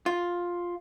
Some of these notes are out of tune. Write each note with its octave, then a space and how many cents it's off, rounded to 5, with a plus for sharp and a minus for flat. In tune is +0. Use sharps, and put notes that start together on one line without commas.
F4 +5